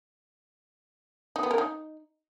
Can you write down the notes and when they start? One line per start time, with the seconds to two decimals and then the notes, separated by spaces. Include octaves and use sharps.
1.36 D#4
1.43 B3
1.51 A#4
1.58 D#4